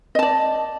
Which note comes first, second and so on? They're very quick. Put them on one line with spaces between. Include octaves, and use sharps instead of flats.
D#5 A5 D5